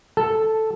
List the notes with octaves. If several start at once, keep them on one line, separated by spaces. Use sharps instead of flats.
A4